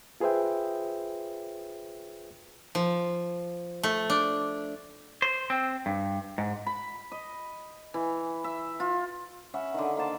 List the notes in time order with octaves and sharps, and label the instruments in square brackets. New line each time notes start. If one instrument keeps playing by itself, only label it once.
[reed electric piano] F4 G#4 B4 C5 E5 G5
[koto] F3
A3
D4
[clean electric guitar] C5
C4
G2
G#2
[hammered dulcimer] B5
D#5
E3
E5
F4
C#4 E5 F#5 B5
D3 D#3
A#3 C5 A5